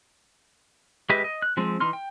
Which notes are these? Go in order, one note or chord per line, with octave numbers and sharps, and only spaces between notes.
G#3 G4 B4 D#5 E5
D#5
F#6
F3 G#3 C4
E3 D#4 C6 F6
G5